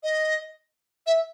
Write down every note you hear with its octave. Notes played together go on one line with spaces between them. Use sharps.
D#5
E5